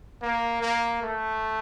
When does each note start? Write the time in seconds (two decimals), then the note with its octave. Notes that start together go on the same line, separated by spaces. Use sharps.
0.22 A#3
0.62 A#3
1.03 A3